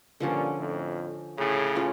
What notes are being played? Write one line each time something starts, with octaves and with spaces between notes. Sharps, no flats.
G2 A#2 D3 F3 C#4
F2 A2
A2 C#3
C#4 F4